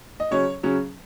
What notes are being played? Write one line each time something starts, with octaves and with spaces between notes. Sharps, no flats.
D#5
C#3 F#3 C#4 C#5
C#3 F#3 C#4